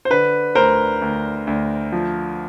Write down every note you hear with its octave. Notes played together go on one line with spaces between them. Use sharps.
C5
D3 B4
D2 A#4 C5
D2
D2
F3